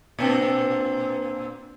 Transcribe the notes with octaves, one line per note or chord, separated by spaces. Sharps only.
A#2 C4 D4